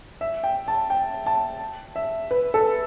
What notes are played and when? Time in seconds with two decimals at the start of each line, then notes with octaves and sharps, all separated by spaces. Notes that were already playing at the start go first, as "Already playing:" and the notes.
0.21 E5
0.43 G5
0.68 A5
0.90 G5
1.26 A5
1.96 E5
2.31 B4
2.54 A4